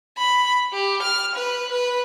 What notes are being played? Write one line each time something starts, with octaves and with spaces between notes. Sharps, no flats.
B5
G4
F6
B4
B4